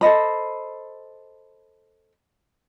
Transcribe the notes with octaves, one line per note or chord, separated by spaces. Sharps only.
A4 C5 D#5 B5